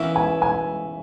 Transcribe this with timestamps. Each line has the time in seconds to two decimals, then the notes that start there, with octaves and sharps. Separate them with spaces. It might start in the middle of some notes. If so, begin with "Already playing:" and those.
Already playing: C#3 E3 B3 E4 A#4 E5
0.16 G#5
0.42 G#5